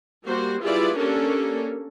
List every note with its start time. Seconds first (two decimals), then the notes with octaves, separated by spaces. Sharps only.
0.24 G3 A#3 F#4 C5
0.61 G3 E4 F4 G#4 B4 D5
0.96 A#3 C#4 D4 G4 A4 A#4